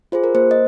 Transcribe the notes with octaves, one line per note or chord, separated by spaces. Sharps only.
F4 G#4 C5
A#4
A#3 C5
D#5